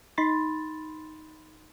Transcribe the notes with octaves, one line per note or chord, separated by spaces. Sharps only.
D#4 B5 C6 A6